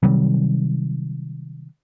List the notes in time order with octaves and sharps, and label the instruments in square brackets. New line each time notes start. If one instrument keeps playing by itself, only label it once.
[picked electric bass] C3 D#3 F#3 G3